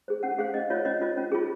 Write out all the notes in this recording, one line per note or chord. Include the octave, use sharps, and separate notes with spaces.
G#4 C5
C#4 F#5
G#4 C5 F5
C#4 D#5
F4 C5 C#5
C#4 D#5
F4 C5
C#4
F4 G#4